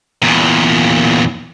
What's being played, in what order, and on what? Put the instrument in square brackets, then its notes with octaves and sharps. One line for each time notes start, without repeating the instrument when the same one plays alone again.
[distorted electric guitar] E2 A#2